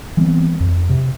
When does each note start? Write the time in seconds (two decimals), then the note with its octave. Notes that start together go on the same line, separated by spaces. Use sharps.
0.17 E3 G3 B3 C4
0.60 F2
0.89 C3